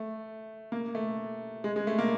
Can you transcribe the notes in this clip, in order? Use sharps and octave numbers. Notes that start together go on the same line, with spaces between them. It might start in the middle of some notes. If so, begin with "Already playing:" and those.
Already playing: A3
A#3
A3
G#3
G#3
A3
A#3